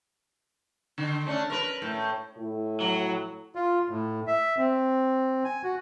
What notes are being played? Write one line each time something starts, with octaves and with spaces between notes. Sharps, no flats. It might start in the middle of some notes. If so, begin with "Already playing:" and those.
D3
A3 C#4 D4
A#4 B4
A2
A2
F#3
F4
A2
E5
C4
G#5
F#4